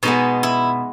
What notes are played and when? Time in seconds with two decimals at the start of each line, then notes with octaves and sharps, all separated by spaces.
0.03 B2 G#3 B3 D#4
0.43 E4